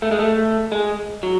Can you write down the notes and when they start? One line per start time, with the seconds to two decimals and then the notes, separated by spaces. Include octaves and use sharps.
0.02 A3
0.11 G#3
0.19 A3
0.72 G#3
1.23 F#3